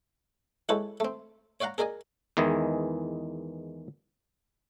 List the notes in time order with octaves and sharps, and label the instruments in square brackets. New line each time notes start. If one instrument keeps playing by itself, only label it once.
[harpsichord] G#3 E4 G4 A4 B4 C#5
A3 C4
C#5 D5 F5 F#5 A#5
G#4 A#4 D5 D#5 G#5
[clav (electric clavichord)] E2 D#3 E3 G#3 G#4